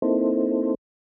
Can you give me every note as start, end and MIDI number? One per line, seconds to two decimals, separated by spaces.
0.02 0.75 58
0.02 0.75 60
0.02 0.75 63
0.02 0.75 64
0.02 0.75 69
0.02 0.75 72